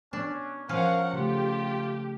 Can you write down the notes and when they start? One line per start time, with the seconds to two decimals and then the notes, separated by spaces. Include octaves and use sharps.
0.13 B3 C#4 D4
0.69 F3 C#4 A#4 F5 F#5
1.13 C#3 A3 F4 G4